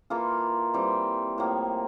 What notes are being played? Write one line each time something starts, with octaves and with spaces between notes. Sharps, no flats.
E3 A#3 F4 A4
E3 G3 C4
A2 F3 A#3